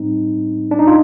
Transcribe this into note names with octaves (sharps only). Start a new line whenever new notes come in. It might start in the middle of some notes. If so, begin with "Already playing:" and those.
Already playing: A2 G3 C4 D#4
D4
D#4
F4